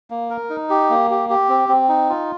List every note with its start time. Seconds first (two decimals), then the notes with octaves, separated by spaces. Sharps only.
0.10 A#3
0.30 A#4
0.50 D#4
0.70 G4
0.90 A#3
1.10 G4
1.30 G4
1.49 C4
1.69 C4
1.89 D#4
2.10 F4